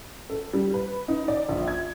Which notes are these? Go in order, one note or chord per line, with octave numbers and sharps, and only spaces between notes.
A4
G3
B4
D#4
D5
A#1
G#6